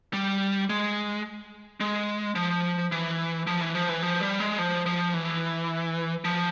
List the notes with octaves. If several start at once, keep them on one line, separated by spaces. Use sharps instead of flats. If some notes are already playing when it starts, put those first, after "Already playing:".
G3
G#3
G#3
F3
E3
F3
E3
F3
E3
F3
G3
G#3
F3
F3
E3
F3